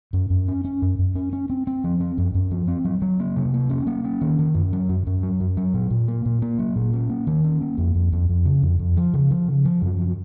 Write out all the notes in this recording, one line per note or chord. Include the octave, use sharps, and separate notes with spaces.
F#2
F#2
C#4
C#4
F#2
F#2
C#4
C#4
C4
C4
F3
C4
F#2
F#2
F3
C4
F#3
F#3
A#3
C3
A#3
C#4
A#3
C#4
D#3
D#3
F#2
F#3
F#2
F#2
F#3
F#2
F#3
A#2
A#2
A#3
A#2
A#3
F#3
A#2
C#4
A#3
D#3
C#4
A#3
F2
F2
F2
F2
C#3
F2
F2
F3
C#3
F3
C#3
F3
F#2
F3